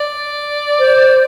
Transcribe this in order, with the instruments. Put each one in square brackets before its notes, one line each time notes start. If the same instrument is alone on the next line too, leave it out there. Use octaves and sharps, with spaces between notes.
[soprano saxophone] D5
[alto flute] C5